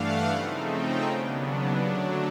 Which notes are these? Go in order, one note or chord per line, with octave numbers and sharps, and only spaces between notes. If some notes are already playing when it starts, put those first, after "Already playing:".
Already playing: G2 E3 A3 D4 F5 F#5
C#3 F3 A3 C4 D#4
G5
D#2 C#3 F#3 B3 D4
D3 F#3 A3 D4